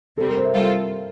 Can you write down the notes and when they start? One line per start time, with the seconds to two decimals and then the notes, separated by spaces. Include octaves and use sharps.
0.17 C3 G3 C4 A4
0.27 A#4
0.36 C5
0.45 E5
0.53 G3 C4 F4 A4 F5